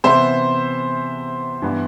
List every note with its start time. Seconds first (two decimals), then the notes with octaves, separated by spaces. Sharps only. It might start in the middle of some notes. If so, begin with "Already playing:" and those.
0.04 C3 E3 B3 C5 E5
1.62 G2 E3 B3